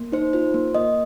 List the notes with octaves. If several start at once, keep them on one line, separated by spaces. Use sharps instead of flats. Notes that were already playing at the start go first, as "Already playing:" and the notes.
Already playing: A#3
D#4 C5
F4 C5
A#3
A#3 D#5